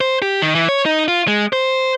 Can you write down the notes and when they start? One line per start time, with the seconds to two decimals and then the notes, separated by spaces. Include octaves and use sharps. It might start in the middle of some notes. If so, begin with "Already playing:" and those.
0.01 C5
0.22 G4
0.42 D#3
0.55 E3
0.69 C#5
0.86 D#4
1.08 F4
1.28 G#3
1.53 C5